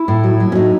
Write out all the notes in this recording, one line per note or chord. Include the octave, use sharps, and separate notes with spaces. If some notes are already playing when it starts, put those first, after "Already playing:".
Already playing: E4
A2
F#3
F#3
C#4
A2 D#4